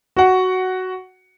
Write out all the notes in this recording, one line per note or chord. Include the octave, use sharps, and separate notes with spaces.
F#4 F#5